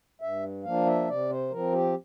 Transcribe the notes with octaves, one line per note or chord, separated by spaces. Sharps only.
G2 E5
F3 A#3 D4 F5
E5
C3 D5
C5
F3 C4 A#4
G4